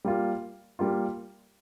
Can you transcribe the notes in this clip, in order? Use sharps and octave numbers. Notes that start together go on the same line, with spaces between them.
G3 A#3 F4
G3 A#3 F4